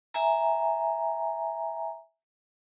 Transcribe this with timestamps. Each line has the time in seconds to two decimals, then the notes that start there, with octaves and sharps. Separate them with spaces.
0.14 E5 G#5 A#5